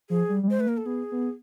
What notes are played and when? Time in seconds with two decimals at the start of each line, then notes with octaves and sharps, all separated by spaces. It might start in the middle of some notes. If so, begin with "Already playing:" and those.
0.10 F3 G#4
0.29 G3
0.43 G3
0.48 G#3 C5
0.59 A3 B4
0.67 A#3 A#4
0.77 A4
0.86 B3 G#4
1.12 B3